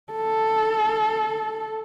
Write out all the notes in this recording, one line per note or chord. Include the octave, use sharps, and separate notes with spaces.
A4